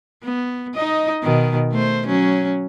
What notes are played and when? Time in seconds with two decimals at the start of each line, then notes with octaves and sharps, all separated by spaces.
0.23 B3
0.75 D#4 D#5
1.22 B2 D#3
1.72 A3 C5
2.07 F#3 C#4